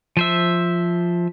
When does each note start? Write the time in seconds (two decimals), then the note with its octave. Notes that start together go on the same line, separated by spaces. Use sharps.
0.17 F3 C5 E5